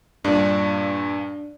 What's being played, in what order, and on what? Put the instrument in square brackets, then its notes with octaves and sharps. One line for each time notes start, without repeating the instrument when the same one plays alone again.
[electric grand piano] G2 A#2 [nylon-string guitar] D4